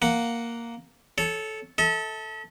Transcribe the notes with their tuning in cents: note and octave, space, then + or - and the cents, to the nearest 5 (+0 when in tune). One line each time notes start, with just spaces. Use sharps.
A#3 +0 F#5 +0
A4 -15 C#5 +0
A4 +0 E5 -45